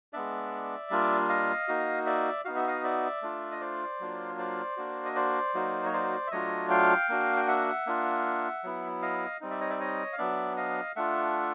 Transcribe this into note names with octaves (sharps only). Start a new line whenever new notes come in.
G#3 B3 D4 D5 E5
G3 A#3 D4 F4
D#5 F5
A#3 D#4 F#4
D5 E5
B3 D#4 F#4 F5
E5
D#5 F5
D5 E5
A3 D4 F4
D#5
C5 D5
F#3 A#3 D4 F4
C5 D5
A#3 D4 F#4
D#5
C5 D5
F#3 A#3 D#4 F#4
C#5
C5 D5
E5
F#3 A3 D4 F4 C#5 D#5
F5 G5
A#3 D4 F#4
G5
E5 F#5
A#3 D4 F4
F#3 B3 E4
D#5 F5
G3 C4 D#4
D5 E5
C#5 D#5
D5 E5
C#5 D#5
F5
F#3 B3 D4 D5 E5
D#5 F5
A3 D4 F4 E5 F#5